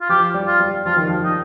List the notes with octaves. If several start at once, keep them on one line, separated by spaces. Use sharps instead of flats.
F4
F3 G4
G3
F4
G3
F3 F4
D#3
F3
D#4